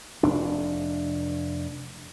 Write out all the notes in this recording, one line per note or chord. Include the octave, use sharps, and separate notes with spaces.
F1 D4